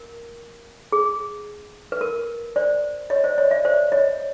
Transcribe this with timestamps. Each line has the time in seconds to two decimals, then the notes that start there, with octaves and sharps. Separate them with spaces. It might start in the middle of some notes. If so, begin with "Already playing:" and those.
Already playing: A#4
0.92 G#4
1.92 B4
2.01 A#4
2.56 C5 D5
3.10 C#5 D#5
3.24 C5 D5
3.38 C#5 D#5
3.51 D5 E5
3.65 C5 D5
3.92 C#5 D#5